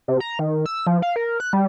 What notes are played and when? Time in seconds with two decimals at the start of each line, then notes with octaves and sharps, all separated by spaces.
0.08 C3
0.20 A#5
0.39 D#3
0.66 E6
0.87 F3
1.02 F5
1.16 A#4
1.40 F#6
1.53 G3